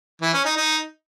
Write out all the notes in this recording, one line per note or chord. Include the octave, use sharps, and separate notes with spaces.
E3
C#4
D#4
D#4